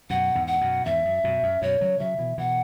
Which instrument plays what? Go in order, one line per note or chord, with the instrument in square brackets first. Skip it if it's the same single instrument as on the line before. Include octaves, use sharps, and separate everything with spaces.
[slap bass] F#2 B2 [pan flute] F#5
[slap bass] E2 G#2
[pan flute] F#5
[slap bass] F#2 B2
[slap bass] E2 G#2 [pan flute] E5
[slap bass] F#2
F#2 B2
F#2
[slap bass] F#2 B2 [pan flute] C#5
[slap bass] C#3 F#3
[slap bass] C#3 F#3 [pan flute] E5
[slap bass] B2 E3
[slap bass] B2 E3 [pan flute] F#5